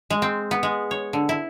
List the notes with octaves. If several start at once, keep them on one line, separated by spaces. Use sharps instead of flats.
G#3
C4
B3
G#3
C#5
D3
E4